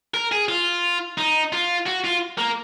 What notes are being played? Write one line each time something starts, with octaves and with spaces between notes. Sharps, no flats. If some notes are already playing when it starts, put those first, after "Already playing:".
A#4
G#4
F4
D#4
F4
F#4
F4
A#3